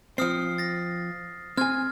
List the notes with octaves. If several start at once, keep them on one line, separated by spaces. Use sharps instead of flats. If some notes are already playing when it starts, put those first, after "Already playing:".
F3 C4 D#6 F6 C7
A6 A#6
C4 G#5 F6 G#6